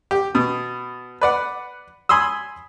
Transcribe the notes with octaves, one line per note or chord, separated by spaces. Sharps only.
G4
B2
B4 D5 F#5
G#5 B5 C6 D#6 E6